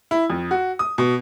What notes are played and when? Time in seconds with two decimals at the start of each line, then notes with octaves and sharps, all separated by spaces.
0.11 E4
0.30 F2
0.51 F#4
0.79 D#6
0.98 B2